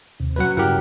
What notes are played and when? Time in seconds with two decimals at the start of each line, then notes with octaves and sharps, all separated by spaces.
0.20 D#2 C3
0.36 A2 F#3 C#4 B4 F#5
0.57 G2 C#3 E4 G4 A#4 F#5